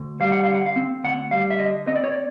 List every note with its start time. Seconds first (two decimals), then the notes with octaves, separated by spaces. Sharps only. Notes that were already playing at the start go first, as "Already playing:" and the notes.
Already playing: D2
0.20 G3 F5
0.32 F#5
0.43 D3 F5
0.54 F#5
0.66 F5
0.76 C4
1.04 D2 F#5
1.31 G3 F5
1.50 E5
1.59 D3 D#5
1.87 C4 D#5
1.96 D5
2.04 C#5
2.12 D5